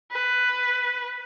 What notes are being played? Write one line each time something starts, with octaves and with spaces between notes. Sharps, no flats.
B4